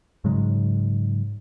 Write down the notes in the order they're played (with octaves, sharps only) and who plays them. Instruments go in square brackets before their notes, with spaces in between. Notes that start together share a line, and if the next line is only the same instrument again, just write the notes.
[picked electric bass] G#2 C#3 F#3 G#3